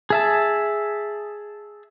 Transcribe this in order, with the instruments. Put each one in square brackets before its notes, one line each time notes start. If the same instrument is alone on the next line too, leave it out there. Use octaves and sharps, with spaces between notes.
[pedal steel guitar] G#4 E5 A5